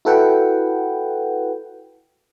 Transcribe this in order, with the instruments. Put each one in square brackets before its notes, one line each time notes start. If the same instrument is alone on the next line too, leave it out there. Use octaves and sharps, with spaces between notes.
[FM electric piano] E4 F#4 A4 B4 F#5 G5